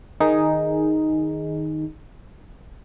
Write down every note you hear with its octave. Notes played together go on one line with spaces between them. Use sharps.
D#3 D#4 G#4